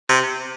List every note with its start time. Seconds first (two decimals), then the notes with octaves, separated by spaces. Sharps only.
0.09 C3